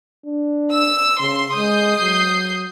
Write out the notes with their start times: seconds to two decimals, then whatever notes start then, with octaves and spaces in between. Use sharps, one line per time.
0.26 D4
0.72 E6
1.20 C#3 C6
1.57 G#3 D#6 G6 C7
2.01 F#3